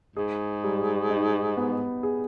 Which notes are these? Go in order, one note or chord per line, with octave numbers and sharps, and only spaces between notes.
G#2 G#4
G3
D#4
B3
G#4